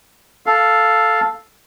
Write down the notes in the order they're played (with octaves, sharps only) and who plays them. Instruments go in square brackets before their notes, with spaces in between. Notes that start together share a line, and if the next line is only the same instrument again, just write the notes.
[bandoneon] A4 F5